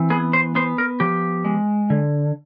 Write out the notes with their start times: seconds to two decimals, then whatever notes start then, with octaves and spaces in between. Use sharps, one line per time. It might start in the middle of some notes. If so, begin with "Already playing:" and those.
Already playing: E3 C4
0.10 B3 G#4
0.33 C5
0.55 B3 C5
0.78 A#4
1.00 F3 G4
1.45 G#3
1.90 D3